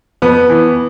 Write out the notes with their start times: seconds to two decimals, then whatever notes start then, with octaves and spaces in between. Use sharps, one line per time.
0.22 F2 B3
0.50 E3